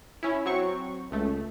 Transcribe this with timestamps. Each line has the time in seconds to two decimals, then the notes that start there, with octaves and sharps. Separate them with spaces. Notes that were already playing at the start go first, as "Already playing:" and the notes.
0.23 C#4 E4
0.46 F#3 C4 C#6
1.11 C#2 A3